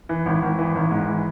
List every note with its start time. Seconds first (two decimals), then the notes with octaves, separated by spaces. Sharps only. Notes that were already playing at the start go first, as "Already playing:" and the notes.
0.09 E3
0.26 G#1
0.42 G#1
0.58 E3
0.75 G#1
0.91 G#2
1.08 E3